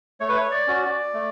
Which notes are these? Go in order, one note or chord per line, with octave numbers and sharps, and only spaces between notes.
A3 C#5
B4
C#5
D5
C#4 F#4
D5
A3